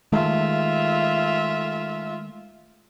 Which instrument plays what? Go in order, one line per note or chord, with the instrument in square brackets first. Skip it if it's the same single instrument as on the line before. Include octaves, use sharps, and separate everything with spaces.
[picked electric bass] D#3 G#3 A3 [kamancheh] F4 E5